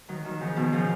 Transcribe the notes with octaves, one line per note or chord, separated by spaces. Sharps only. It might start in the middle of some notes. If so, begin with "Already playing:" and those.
D#3 F#3
D#3 F#3
C#3 F3
B2 D#3
C#3 F3